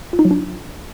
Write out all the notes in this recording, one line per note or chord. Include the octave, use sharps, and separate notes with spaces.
F4
D#4
F#3
D4